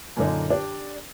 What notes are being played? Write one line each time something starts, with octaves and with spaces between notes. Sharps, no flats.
F#2 A#2 D3 A#3 D4 D#4
D4 G4